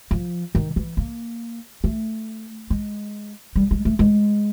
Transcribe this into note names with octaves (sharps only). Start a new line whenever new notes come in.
F3
D#3
E3
A#3
A3
G#3
G3
G#3
A3
G#3